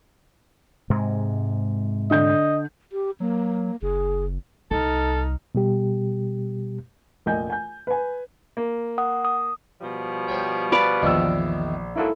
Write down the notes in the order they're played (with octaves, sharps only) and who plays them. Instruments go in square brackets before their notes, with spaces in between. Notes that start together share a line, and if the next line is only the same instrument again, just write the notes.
[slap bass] G#2 C3 G#3
[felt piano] D3 G6 [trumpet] D#5
[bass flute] G4
[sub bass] F#3 [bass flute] A#3
[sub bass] F#1 [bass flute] G#4
[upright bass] C2 [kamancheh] D#4 F6 [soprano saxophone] A4
[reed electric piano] B2 G3 G4
[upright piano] F1 A#1 A#4 D#5 G#5 G6
G#5 G6
B4 G#5
[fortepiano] A#3
[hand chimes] F#5 D#6
D#6
[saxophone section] B2 F3 G3
[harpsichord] C5 C#5 G5
[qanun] B4 D5 F5 [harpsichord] A5 [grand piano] B5
[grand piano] A#1 E6 [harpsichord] E2 D#3
[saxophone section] G#2 F#3 A#3 [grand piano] E4 A4